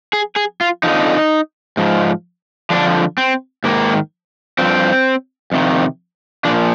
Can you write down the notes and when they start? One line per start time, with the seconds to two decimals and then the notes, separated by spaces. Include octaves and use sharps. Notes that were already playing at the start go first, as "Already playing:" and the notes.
0.13 G#4
0.36 G#4
0.61 F4
0.83 F2 D3 F3 D#4
1.77 G#2 F3
2.70 F2 D3 F3 D4
3.18 C4
3.64 G#2 D#3 A#3
4.58 G2 F3 C4
5.52 F2 C3 D#3
6.45 F3 D4
6.48 A#2